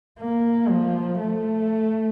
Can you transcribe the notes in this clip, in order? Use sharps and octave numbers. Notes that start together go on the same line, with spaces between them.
A#3
F3
A3